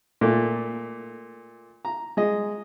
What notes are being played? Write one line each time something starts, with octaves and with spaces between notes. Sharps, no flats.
A#2 A3
A#5
G#3 D#5